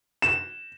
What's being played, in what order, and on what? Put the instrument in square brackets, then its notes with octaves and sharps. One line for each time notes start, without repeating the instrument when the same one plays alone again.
[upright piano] E7